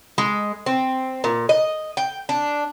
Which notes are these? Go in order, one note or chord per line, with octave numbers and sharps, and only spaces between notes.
G#3
C4
A#2
D#5
G5
D4